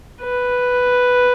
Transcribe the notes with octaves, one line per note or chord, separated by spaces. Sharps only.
B4